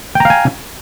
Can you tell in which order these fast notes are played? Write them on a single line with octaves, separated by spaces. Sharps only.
G5 A#5 F5 G#5